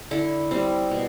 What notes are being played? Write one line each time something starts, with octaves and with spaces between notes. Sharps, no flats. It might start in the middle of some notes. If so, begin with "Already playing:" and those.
D3 E4
G3 C4
B2